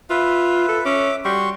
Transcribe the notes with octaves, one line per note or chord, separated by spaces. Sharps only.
F4 B4 E5
A4
C#4 E5 D6
G3 F#4 C6 C#6